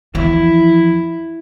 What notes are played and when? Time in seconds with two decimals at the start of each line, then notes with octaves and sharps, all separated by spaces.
0.15 E2 F3 E4